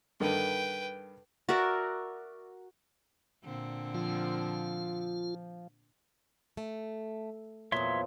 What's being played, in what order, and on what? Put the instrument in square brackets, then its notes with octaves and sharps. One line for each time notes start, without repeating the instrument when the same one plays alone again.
[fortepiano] G2 D3 D#3 [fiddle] B4 G5
[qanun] F#4 A#4 D5 E5
[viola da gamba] A#2 D3 C4
[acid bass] F3 [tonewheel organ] F4
[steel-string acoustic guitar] A3
[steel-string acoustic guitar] E2 A#2 [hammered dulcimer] F3 F#3 B3 [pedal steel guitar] C#5 E5 C6